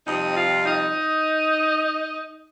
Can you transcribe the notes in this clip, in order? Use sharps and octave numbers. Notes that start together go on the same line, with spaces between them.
F2 C3 G3 C4 D#4 D#5
F4 F5
D#4 D#5